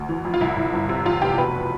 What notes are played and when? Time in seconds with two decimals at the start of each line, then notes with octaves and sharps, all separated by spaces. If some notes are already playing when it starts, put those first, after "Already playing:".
Already playing: D2
0.09 E3
0.25 F2
0.34 F4
0.41 C2 E4
0.56 C2
0.73 G1
0.89 C3
1.05 E2 F4
1.22 F1 G4
1.38 B2 B4